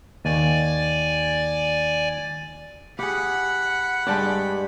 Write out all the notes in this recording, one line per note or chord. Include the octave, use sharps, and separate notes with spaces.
D#2 D5 G#5
G4 G#4 F#5 B5
G2 G#3 D4 G4 D5 G5